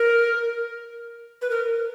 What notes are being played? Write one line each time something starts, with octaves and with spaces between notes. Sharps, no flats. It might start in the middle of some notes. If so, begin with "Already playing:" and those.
Already playing: A#4
B4
A#4